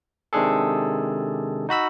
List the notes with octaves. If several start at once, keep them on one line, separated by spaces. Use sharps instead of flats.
C3 D#3 G#3 D4 G#4 A4
D#4 F#4 B5 E6